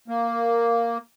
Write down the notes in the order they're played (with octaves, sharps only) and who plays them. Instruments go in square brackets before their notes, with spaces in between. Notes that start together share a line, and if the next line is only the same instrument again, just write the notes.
[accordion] A#3